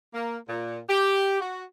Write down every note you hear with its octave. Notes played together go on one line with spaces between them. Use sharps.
A#3
A#2
G4
F#4